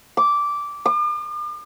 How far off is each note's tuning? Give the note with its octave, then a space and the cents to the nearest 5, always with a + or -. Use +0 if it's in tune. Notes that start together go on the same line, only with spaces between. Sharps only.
D6 -10
D6 +45